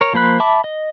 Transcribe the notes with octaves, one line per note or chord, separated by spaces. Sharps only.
A#4 C#5
F3 A#3 C5 B5 F#6
E5 A5 B5 D6
D#5